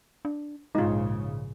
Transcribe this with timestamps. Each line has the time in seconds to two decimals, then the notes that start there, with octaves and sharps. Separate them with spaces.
0.25 D4
0.75 A#1 G#2 C#3 G#3 D#4 F4